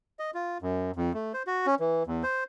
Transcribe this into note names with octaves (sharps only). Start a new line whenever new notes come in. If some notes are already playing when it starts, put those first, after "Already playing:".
D#5
F4
F#2
F2
A3
C5
F#4
C#4
E3
E2
C5